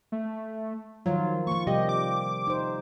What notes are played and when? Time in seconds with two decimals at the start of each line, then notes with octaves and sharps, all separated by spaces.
0.12 A3
1.06 D#3 F3 F#3 F4
1.47 F3 A#3 C#6
1.67 C3 G3 G4 D#5
1.89 D6
2.47 D#4 C5